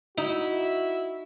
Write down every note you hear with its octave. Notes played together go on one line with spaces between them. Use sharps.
D#4 E4 F#4